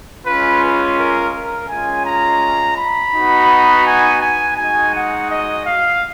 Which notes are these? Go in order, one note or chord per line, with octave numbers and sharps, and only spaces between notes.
G#3 C#4 F4 B4
A#4
A#4
G#3 C#4 F4 G#5
A#5
B5
B3 D#4 F#4
G#5
G#5
G#3 D#4 F#4 G#5
F#5
D#5
F5